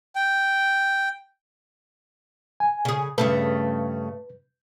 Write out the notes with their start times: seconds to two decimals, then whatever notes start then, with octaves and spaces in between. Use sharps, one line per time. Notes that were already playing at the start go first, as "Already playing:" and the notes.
0.16 G5
2.60 G#5
2.85 C#3 G#4
3.18 G2 C#3 A3 B4